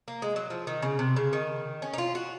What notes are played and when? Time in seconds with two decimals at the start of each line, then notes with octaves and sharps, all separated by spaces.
0.08 A#3
0.22 G#3
0.36 F#3
0.50 F3
0.67 D#3
0.82 C#3
0.99 C3
1.16 C#3
1.33 D#3
1.82 C#4
1.94 D#4
1.98 F4
2.15 F#4